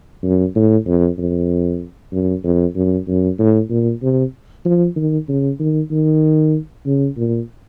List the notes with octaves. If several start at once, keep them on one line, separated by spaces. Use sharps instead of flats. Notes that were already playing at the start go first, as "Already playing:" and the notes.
F#2
A2
F2
F2
F#2
F2
F#2
F#2
A2
A#2
C3
F3
D#3
C#3
D#3
D#3
C#3
A#2